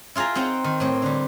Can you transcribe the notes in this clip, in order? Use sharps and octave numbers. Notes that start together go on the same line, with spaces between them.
E4 F4 G#4 G5 A#5
C4 D#4 C5 F#5 G5 A#5
D#3
A2 C4
D3 G3